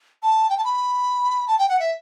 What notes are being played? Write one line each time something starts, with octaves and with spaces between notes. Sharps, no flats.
A5
G5
A5
B5
A5
G5
F#5
E5